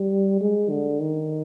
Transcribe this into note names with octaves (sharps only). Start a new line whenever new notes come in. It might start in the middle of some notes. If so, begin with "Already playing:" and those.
Already playing: G3
G#3
D3
D#3